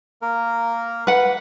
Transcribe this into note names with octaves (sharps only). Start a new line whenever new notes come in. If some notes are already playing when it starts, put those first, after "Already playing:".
A#3 A#4
B4 F#5